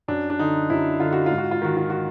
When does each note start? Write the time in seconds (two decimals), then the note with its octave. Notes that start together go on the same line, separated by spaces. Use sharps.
0.08 F#2 D4
0.30 D4
0.39 D3 D#4
0.70 F#2 E4
1.00 D3 F4
1.13 F#4
1.26 G#2 F4
1.38 F#4
1.51 F4
1.62 D#3 F#4
1.77 F4
1.90 F#4